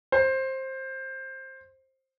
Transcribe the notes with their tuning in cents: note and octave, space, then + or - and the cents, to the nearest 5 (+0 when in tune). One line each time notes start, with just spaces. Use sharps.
C5 +15